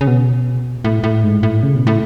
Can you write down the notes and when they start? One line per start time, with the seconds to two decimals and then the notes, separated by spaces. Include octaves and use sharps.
0.01 C#3
0.07 B2
0.84 A2
1.04 A2
1.23 G#2
1.43 A2
1.63 C#3
1.75 B2
1.87 A2